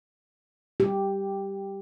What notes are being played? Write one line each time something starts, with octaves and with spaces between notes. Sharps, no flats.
G4